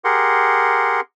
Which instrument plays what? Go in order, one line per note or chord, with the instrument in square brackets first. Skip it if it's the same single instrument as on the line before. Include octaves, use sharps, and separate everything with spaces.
[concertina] G4 G#4 A#4 F#5 C6